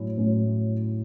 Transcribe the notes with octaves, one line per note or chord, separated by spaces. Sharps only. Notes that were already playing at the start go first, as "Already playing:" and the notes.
Already playing: A2 F#3 C#4 E4
A2 F#3 C#4 E4